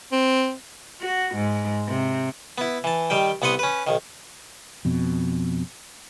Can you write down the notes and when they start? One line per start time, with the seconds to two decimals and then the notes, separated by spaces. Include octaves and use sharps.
0.12 C4
1.02 F#4
1.35 G#2
1.88 C3
2.58 B3 E4
2.84 E3 A5
3.10 D#3 G3 G5
3.42 C2 B3 F#5 C6 D#6
3.59 C#4 B4
3.87 B1 D#3
4.85 F2 B2